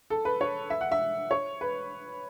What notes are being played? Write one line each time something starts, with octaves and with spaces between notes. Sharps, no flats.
A4
B4
C#5
E5
F#5
E5
C#5
B4